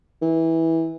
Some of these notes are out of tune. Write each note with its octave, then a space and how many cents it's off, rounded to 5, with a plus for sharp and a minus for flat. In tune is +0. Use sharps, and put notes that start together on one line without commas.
E3 -15